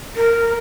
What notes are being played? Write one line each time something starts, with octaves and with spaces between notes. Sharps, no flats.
A#4